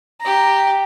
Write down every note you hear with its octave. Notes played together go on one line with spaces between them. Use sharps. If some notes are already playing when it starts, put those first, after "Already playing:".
G4 A#5